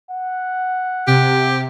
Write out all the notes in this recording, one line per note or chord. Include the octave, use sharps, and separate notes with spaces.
F#5
C3 G4